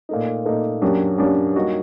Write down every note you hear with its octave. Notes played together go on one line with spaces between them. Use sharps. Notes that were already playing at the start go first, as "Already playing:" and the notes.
A#2 A3 D#4
A#2 A3 D#4
F#2 F#3 A#3 D4 G4
F#2 F#3 A#3 D4 G4
G3 A#3 D#4 F#4